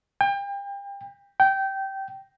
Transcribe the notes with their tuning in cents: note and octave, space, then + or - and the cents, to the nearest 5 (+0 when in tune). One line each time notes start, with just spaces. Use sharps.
G5 +35
G5 -15